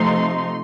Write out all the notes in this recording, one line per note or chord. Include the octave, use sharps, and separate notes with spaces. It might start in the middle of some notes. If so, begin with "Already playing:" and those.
Already playing: C3 F3 A3 D#4 C6